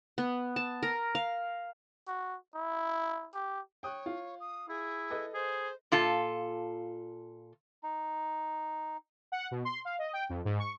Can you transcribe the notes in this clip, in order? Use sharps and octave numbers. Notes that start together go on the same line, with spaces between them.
B3
A5
A#4
F5
F#4
E4
G4
C#5 G5 D#6 F#6
F4
D#6
E4 G#4
A4 B4 D#5
G#4 C5
A#2 F4 A4
D#4
F#5
B2
C6
F5
D#5
G5
F2
G#2
C#6